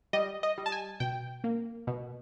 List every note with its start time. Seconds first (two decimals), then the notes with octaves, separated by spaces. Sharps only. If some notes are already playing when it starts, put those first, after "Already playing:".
0.13 G3 D#5
0.43 D#5
0.58 G3
0.66 A5
0.72 G#5
1.00 B2 G5
1.44 A#3
1.87 B2